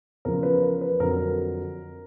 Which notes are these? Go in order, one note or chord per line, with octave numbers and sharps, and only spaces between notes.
E2 C#3 F3 A#4
B4
A#4
B4
F2 D3 F#3 A#4